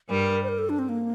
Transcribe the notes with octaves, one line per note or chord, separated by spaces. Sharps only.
G2 G3 A#4
C5
A#4
A4
D4
C4
A#3